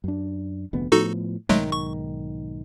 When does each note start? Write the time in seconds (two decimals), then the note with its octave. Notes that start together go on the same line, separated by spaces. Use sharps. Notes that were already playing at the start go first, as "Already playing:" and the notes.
0.04 F#2 D4
0.73 F1 D2 B3
0.92 A2 F3 B3 D#4 F#4 A4
1.49 B1 G#2 D#3 F#3 G#3 A3
1.72 C#6